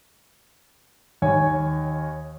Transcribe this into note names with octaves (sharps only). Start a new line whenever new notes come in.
D#2 C#5 G#5